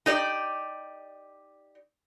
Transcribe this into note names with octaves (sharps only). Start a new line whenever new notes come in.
D#4 G4 D5